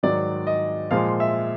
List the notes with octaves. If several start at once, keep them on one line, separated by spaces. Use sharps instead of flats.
G#2 D#3 F#3 D5
D#5
A#2 F3 G#3 F5
E5